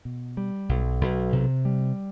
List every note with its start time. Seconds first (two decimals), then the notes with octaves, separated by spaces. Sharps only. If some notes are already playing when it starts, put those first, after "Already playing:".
0.05 B2
0.37 G3
0.69 B1
1.01 B1
1.33 C3
1.65 G3